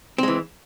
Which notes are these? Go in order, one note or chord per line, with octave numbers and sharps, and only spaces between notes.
E3 G#3 C4